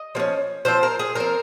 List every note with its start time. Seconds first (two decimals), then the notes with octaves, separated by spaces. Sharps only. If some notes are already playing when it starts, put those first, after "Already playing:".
Already playing: D#5
0.15 F3 A#3
0.19 C#4
0.65 F3 C4 C5
0.83 A#4
0.99 G#4
1.15 F3 C4 A#4